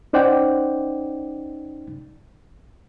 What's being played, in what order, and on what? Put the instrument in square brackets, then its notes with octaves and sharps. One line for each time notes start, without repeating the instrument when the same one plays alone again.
[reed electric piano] C#4 D#4 C5 D5 F#5 G5